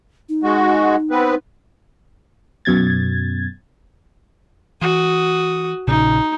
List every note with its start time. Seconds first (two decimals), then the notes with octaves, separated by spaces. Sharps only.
0.29 D#4
0.43 G#3 F#4
1.11 B3 C4 B4
2.65 F#2 B2 G#6 A6
4.81 E3 F#4 D#6
5.87 A#1 A#2 C#3 D#4